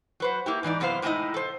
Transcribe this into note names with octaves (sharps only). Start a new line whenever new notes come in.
F#3 B4 C5
A#3 E4 G4
G#2 E3 D#4 D5
F#2 C3 B3 E4 C5 F5
A2 G3 G#3 D#4 E4 D#5
A4 C5